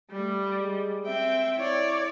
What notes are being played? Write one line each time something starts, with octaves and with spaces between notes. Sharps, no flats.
G3 A3
G#3
C4 E5 G5
E4 C#5 D5